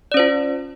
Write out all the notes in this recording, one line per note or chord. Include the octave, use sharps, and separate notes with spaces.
C#4 F4 C5 D5